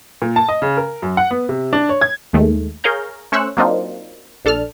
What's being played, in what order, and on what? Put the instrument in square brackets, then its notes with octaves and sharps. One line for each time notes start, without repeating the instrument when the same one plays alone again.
[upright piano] A#2
A5
D#5
C#3
A#4
F#2
F#5
B3
C3
D4
C#5
G#6
[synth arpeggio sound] D#2 D#3 G#3 A3
G#4 A#4 C#5 F5 A#5 G6
A3 C#4 C5 C#6 E6 F#6
F#3 A#3 C4 D4 D#4 F4
A#1 D4 A4 A5 F6